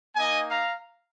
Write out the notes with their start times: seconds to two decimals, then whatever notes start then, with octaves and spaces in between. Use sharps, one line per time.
0.16 A#3 D#4 D#5 G#5
0.51 F5 A#5